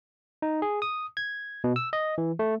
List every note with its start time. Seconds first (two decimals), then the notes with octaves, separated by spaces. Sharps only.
0.42 D#4
0.62 G#4
0.82 D#6
1.17 G#6
1.64 B2
1.76 E6
1.93 D#5
2.18 E3
2.39 A3